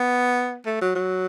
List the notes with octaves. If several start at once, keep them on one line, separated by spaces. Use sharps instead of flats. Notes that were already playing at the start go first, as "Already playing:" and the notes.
Already playing: B3
A3
F#3
F#3